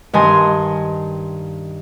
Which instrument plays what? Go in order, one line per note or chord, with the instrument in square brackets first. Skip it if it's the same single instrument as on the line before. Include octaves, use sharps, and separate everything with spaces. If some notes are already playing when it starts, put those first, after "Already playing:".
[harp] G2 D#3 D#5 G#5 C6